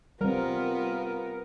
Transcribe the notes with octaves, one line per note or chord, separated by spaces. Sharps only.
G3 B3 C4 F4 A#4